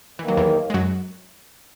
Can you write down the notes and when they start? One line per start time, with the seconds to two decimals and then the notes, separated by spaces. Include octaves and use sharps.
0.19 D#2 D#3 E3 A#3
0.28 F#3
0.37 E2 E3
0.70 G#3
0.74 F#2 F#3